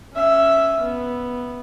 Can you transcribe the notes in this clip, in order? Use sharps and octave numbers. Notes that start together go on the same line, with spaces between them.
C#4 E5
B3